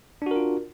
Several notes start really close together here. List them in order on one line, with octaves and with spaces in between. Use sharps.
D4 F#4 A#4 F4